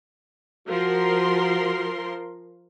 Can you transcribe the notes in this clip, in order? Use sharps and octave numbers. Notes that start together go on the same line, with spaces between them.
F3 F#4 A#4 C6